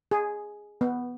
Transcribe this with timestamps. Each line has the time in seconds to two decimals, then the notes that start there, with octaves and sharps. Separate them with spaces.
0.11 G#4
0.81 B3